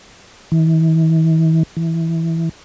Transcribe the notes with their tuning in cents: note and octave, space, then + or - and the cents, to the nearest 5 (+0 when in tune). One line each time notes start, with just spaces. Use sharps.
E3 -40
E3 -5